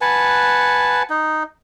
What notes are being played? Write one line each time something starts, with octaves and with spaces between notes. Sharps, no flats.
B4 F#5 G#5 A5
D#4